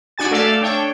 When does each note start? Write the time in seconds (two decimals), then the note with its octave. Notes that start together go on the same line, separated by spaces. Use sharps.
0.18 D4 F#4 G#5 A6
0.31 A3 A4 D5 F5
0.61 D4 C#5 G5